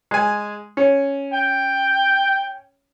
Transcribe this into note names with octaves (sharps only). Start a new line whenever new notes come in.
G#3 G#5
C#4
G5